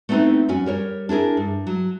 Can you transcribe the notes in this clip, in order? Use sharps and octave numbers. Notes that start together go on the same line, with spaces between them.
A3 B3 C4 D#4 E4 B4
F#2 C#4 F#4 G#5
G3 A#4 C#5
D4 E4 G#4 A#4
G2
F#3